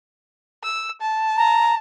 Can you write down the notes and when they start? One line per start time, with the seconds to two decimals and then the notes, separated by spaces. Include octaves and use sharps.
0.64 E6
1.01 A5
1.37 A#5